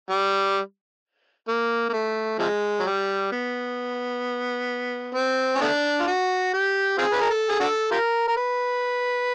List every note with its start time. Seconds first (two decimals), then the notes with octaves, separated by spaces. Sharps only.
0.10 G3
1.48 A#3
1.89 A#3
1.93 A3
2.39 C3 F3 G#3
2.80 F#3
2.86 G3
3.32 B3
5.15 C4
5.56 C#4
5.61 A3 B3 D4
6.00 F4
6.07 F#4
6.53 G4
6.98 C4 F4 G#4
7.13 B4
7.21 A#4
7.30 A4
7.49 G#4
7.60 D4 F#4 A4
7.91 F4 G4 A#4
8.28 A#4
8.37 B4